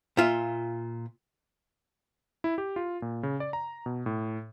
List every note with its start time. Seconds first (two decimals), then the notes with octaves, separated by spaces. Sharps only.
0.17 A#2 F4 E5
2.44 E4
2.58 G4
2.76 F4
3.02 A#2
3.23 C#3
3.40 D5
3.53 A#5
3.86 B2
4.06 A2